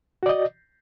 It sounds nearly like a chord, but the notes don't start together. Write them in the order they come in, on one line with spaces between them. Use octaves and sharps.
F#4 D5 D#5